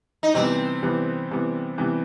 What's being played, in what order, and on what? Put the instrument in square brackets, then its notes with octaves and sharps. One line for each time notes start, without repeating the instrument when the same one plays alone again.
[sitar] D#4
[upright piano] C3 E3 G3 B3 [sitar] C4
[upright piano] C3 E3 G3 B3
C3 E3 G3 B3
C3 E3 G3 B3